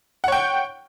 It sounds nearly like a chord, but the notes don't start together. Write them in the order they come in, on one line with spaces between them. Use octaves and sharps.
F#5 C#5 G5